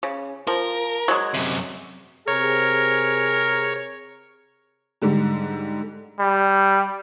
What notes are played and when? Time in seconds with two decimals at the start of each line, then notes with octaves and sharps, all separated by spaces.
0.03 C#3
0.47 F3 A#4
1.08 F#3 G#3
1.34 F#2 C3
2.28 C3 G#4 A#4 C#5
5.02 G#2 D3 G3
6.19 G3